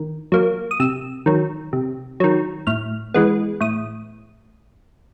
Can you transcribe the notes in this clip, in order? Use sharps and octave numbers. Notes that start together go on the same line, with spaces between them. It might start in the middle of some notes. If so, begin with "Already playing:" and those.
Already playing: D#3
F#3 A#3
D#6
C3 E6
D#3 F#3
C3
D#3 F#3
A2 F6
E3 G#3 B3
A2 D#6